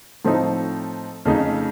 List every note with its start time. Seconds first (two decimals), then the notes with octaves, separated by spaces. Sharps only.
0.25 A2 F3 A3 C4 D#4
1.25 F2 C#3 A3 D#4